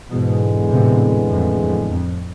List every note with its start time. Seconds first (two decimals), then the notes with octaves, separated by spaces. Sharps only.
0.10 E2 G#2 B2 D3 G#3 B3
0.71 A2 C3
1.31 F2 A2
1.61 F2 A2
1.91 F2